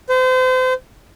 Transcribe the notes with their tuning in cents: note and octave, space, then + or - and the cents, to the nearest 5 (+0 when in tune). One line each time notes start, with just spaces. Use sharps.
C5 -35